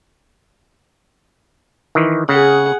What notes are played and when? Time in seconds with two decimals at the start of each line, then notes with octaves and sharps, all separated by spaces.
1.95 D#3 E3
2.29 C#3 G#4 F#5